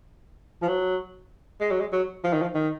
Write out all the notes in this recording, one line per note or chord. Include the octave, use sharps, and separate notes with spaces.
F3
F#3
G#3
F#3
G#3
F#3
F3
D#3
F3
D#3